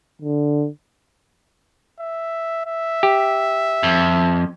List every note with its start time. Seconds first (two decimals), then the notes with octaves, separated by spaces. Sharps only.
0.22 D3
2.00 E5
2.66 E5
3.03 G4
3.83 F2